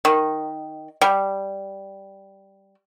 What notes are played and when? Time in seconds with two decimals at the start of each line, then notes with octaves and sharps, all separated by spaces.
0.05 D#3
1.01 G3